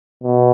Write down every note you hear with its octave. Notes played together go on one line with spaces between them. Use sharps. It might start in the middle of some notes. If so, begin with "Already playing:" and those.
B2